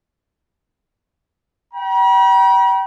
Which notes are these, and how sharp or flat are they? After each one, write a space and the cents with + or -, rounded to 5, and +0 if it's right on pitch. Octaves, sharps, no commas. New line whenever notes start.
G5 -30 B5 -45